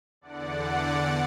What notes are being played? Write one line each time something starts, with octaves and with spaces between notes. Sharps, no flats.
E2 D3 D5 F#5